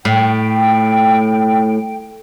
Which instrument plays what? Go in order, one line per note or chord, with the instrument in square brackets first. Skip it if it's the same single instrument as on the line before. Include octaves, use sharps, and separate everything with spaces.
[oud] A2 [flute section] G5